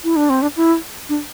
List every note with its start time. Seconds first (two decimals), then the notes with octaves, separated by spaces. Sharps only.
0.04 E4
0.16 D4
0.30 C4
0.42 D4
0.56 E4
1.09 D4